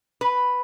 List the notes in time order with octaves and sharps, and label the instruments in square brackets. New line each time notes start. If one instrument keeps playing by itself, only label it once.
[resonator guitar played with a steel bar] B4